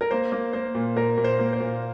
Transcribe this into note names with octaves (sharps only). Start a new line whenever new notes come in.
A#4
A#3 C5
A#3
A#3 C5
A#2
A#2 A#4
A#2
C5
A#3
C5
A#2